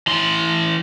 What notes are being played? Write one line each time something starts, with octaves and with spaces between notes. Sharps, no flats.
E3 C6